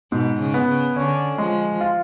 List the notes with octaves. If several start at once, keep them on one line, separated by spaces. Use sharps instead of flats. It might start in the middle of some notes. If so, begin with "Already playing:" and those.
G#2 B2
C#3
B3
C#3
D3 C#4
F3 G#3
F4